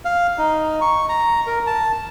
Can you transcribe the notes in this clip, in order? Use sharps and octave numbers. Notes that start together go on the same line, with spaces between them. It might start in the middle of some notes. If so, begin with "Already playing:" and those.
F5
D#4
C#6
A#5
A#4
A5